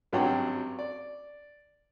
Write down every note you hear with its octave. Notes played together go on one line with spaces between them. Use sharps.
G#1 G2 F#3 C#4 F#5 G5
D5